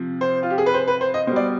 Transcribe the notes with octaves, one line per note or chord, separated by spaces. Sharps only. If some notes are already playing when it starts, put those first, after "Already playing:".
Already playing: C3 F3
C5
F4
G4
G#4
B4
C5
B4
C5
D#5
B2 G3 C5
D5